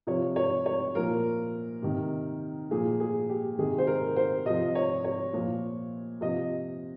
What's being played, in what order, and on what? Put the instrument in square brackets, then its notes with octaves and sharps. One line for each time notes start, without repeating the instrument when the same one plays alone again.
[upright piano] C3 F3 C#5
C#5
C#5
A#2 F3 A#4
C3 D#3
A#2 F3 G#4
G#4
G4
C3 D#3 G#4
C5
A#4
C5
C3 F3 D#5
C#5
C#5
A#2 F3
C3 F3 D#5